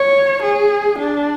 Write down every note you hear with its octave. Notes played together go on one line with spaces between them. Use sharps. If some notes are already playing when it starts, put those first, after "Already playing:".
Already playing: C#5
G#4
D4